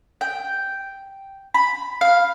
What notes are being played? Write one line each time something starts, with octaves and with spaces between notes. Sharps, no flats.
G5
B5
F5